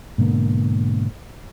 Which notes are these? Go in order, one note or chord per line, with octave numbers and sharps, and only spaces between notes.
G#2 B2 D3 A#3